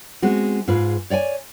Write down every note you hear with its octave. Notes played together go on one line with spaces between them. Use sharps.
G#3 B3 C4 F#4
G#2 F4 G#4 B4
C#5 D5 G5 G#5